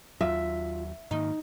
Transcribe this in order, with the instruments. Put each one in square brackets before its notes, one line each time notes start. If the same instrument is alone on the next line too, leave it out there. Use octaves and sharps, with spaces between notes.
[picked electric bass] D#2 F#3 [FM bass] F4 [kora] E5
[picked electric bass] G#2 D#3 A#3 [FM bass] D#4